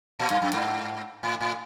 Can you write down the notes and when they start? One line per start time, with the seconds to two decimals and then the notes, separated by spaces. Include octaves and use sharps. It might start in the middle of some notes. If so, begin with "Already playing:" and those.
0.19 A#2
0.30 G2
0.42 F#2
0.53 G#2
1.23 A2
1.41 A2